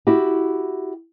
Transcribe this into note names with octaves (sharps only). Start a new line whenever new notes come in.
E4 F#4 G4